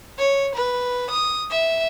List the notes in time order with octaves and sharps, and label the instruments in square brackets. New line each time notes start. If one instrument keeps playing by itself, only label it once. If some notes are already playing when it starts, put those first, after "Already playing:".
[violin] C#5
B4
D#6
E5